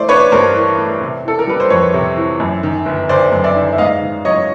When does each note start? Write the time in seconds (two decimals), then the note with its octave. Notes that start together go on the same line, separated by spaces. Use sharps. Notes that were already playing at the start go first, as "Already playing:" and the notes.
Already playing: E3 A3 C5 D5
0.09 D4 B4 C#5
0.32 G2 A#4 C5
0.55 E3
0.78 A3
1.01 C3
1.25 E3 A4
1.39 A#4
1.47 G3 B4
1.60 C5
1.70 F2 B4 C#5
1.94 C3
2.17 E3
2.40 F#2
2.63 D#3
2.86 G1
3.09 G1 C5 D5
3.32 F#2
3.44 D5 E5
3.56 D#3
3.72 E5
3.78 G#2 D#5 F5
4.02 D#3
4.25 F#3 C#5 D#5